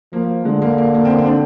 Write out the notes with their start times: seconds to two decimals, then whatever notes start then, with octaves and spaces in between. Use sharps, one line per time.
0.13 F3 A#3
0.45 D3 G#3
0.62 A#3
0.78 A#3
0.95 A#3
1.05 C4
1.10 A#3
1.18 C4
1.26 D4